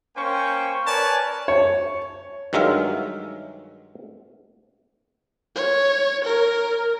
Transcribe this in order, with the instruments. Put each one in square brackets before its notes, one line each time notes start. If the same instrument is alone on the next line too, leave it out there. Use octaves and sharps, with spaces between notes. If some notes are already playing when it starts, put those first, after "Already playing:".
[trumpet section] A#3 C#4 C5 G5 C#6
A#4 B4 C#5 D5 G#5 A5
[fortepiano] C#5
[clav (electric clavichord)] G2 D#3 F#3 G#3 E5 F5
[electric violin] C#5
A#4